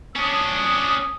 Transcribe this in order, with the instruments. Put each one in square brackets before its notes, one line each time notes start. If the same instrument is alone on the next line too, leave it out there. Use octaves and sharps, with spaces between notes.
[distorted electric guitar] C#4 D4 [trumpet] D#6